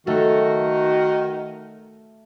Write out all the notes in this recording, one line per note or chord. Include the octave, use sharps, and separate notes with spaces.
D#3 A3 F#4